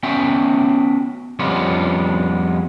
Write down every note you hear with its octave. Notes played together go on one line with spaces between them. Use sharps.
B3 C#4 F#4 E5 G5
F2 G3 G#3 B3 C#4 F4